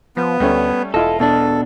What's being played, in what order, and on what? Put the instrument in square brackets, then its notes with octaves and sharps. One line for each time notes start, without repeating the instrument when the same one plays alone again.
[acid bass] F3 [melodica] B3
[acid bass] D2 [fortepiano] G3 A3 C#4
[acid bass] E1 [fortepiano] E4 F4 D#5 [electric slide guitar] A4
[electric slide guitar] B2 D4 [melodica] A4